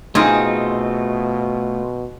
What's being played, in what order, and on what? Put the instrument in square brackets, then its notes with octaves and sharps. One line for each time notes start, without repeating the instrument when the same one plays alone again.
[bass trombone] B2 [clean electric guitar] A3 F4 [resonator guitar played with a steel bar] C4 D#4 [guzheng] G#4